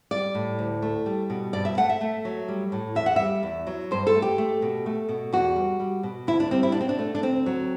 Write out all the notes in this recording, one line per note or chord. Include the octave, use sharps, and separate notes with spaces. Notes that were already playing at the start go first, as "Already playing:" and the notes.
G3 D5
A2
D2
A3
G3
B2
G2 D5
E5
A3 F#5
E5
A3
F#3
G3
A2
E2 E5
F#5
G3 E5
E2
F#3
G2 C5
A4
A3
G4
A3
B2
A3
B2
E2 F#4
G3
G3
B2
D2 E4
D4
G3 C4
E4
B2 D4
C4
D4
A3
D4
D2 C4
F#3